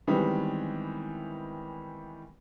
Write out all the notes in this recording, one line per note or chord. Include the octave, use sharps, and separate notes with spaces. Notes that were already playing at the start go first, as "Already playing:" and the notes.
D#3 E3 G3 G#3 B3 C4